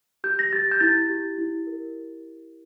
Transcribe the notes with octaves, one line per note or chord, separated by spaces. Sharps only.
G4 G6
A#6
G4 A6
G6
E4 A6
G4
E4
A#4